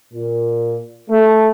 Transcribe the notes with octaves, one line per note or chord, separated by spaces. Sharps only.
A#2
A3